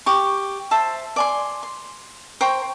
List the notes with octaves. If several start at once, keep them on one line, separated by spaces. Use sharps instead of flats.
G4 C#6
C5 E5 A5
D5 G#5 C6
C6
C5 G5 A#5 C#6